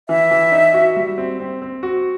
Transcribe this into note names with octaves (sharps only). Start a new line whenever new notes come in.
E3 E5
E3
D#4
F#4
G3
C4
C4
C4
F#4